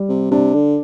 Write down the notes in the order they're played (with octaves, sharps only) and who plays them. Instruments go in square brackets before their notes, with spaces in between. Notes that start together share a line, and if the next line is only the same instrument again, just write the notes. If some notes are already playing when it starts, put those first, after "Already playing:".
Already playing: [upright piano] G3
[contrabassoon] C3
[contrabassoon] C3 [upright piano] D4
[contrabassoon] D3